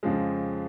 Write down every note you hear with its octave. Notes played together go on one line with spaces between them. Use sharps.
F2 C#3 F3 G#3